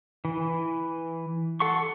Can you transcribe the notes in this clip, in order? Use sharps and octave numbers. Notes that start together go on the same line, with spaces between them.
E3
A4 F#5 C6 C#6